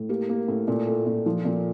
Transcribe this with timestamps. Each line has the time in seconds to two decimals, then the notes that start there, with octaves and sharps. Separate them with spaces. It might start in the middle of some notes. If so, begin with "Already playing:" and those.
Already playing: A2
0.09 A#3 G4
0.29 A#3
0.48 A2
0.68 A#2 A4
0.87 A3
1.06 A#2
1.26 F3
1.45 A#2